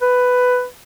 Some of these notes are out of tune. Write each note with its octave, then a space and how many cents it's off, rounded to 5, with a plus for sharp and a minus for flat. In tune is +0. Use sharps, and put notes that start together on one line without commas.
B4 +10